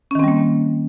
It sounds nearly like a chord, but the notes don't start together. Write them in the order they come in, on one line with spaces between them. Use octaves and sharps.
C#4 D#3 C4 G3 A#3